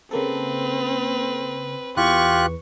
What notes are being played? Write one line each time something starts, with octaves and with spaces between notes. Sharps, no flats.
C#3 A#3 C4 A4 B4
E2 F4 G4 B4 C#6 F#6